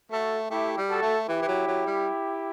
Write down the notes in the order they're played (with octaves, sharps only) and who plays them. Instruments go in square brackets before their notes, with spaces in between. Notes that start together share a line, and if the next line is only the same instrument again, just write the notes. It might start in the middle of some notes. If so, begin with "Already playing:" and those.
[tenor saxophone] A3 [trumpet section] F#4 A4
[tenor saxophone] A3 [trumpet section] E4 G4
[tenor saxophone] G3
[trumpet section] F#4 A4
[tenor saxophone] A3
[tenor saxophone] E3 [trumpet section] E4 G4
[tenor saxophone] E3
F#3
F#3
G3